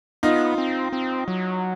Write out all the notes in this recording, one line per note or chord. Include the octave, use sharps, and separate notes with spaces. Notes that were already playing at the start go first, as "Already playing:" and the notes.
B3 D#4 F4
C4
C4
F#3